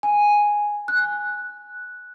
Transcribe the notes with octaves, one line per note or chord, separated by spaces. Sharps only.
G#5
F#6